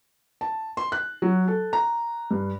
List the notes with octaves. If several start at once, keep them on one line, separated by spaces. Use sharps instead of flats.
A5
C6
F#6
F#3
A4
A#5
G2